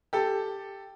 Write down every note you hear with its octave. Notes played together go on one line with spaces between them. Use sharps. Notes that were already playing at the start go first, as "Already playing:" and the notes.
G4 A4